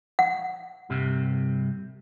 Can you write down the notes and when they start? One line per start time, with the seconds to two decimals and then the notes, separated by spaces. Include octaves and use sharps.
0.19 F#5
0.90 C2 G2 C3